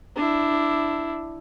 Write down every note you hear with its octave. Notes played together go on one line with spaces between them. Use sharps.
D4 E4